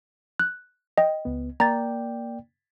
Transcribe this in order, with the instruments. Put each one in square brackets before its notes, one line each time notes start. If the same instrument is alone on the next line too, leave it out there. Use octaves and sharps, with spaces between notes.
[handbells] F#6
D#5 G5
[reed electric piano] C#2 B3
[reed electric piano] A#3 D5 G5 [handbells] A#5 A6